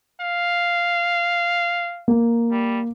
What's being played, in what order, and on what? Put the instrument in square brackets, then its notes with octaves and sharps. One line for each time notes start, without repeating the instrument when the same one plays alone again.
[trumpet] F5
[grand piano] A#3
[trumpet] G3